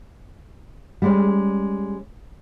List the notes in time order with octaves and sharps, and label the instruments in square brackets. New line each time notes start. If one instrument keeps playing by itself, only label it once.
[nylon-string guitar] G3 G#3 C#4